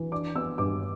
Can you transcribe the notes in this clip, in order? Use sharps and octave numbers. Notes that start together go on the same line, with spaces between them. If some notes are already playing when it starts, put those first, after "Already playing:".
Already playing: E3
D4 D6
B3 E6
G2 D6